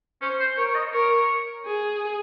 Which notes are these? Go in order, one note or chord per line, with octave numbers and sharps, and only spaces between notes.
C#4 C5
C5
A#4 C#5
C#5
D#5
A#4 C#5
G#4